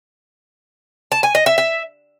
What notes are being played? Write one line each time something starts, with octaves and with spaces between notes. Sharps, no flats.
A5
G#5
D#5
E5
E5